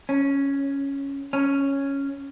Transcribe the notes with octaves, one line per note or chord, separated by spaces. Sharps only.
C#4
C#4